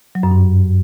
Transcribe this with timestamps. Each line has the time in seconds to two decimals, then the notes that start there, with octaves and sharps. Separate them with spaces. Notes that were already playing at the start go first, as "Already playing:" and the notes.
0.15 F#3
0.23 F#2
0.31 G2